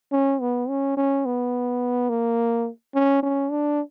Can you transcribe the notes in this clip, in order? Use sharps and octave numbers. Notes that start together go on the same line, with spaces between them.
C#4
B3
C#4
C#4
B3
A#3
C#4
C#4
D4